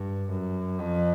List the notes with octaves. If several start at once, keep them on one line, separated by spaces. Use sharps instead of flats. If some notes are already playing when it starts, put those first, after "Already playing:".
Already playing: G2
F#2
F2